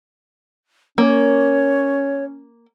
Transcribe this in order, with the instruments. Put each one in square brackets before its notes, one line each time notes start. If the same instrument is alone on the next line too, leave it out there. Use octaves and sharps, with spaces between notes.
[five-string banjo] A#3 [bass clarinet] C#4 [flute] C#5